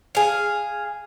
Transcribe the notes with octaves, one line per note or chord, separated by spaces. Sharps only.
G#4 F5